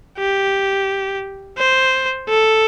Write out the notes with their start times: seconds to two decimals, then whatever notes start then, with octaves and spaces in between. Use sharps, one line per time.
0.18 G4
1.58 C5
2.29 A4